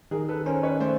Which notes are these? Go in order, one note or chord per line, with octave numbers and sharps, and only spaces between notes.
D#3 G#4 A#4
A4 B4
C#4 A#4 C5
B4 C#5
A3 C5 D5